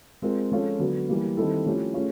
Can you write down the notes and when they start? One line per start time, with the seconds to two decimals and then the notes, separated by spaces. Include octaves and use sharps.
0.22 G#3 C4 F4 A#4
0.51 F3 G#3 C#4 F4 A4
0.79 D3 F#3 B3
1.09 E3 G3 A#3
1.37 D#3 G3 C4 E4 A4
1.66 F3 A3 C#4 E4 G4
1.94 A3 C#4 F4 G#4